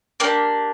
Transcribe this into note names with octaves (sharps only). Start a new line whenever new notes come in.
A#3 D4 G4